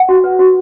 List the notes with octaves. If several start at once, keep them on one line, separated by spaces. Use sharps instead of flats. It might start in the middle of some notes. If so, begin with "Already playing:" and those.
Already playing: F#5
F#4
B4
F#4